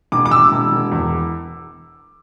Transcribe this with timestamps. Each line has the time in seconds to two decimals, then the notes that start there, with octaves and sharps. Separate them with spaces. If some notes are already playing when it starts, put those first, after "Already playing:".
0.12 E1 D6
0.26 D6
0.31 E1 E6
0.51 E1
0.72 E1
0.92 E2